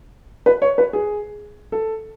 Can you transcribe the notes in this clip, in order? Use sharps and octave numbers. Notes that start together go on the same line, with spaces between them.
B4
C#5
B4
G#4
A4